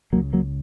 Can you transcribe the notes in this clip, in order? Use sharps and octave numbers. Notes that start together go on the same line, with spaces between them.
C#2 C#3 F#3 A#3
F#3 A#3